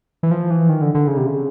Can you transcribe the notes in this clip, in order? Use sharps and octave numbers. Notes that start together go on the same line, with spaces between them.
E3
F3
E3
D#3
D3
D3
C#3
C3
C#3